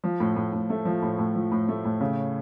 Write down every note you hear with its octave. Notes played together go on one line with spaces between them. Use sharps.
F3
A2
A2
A2
A3
F3
A2
A2
F3
A2
A3
A2
C#3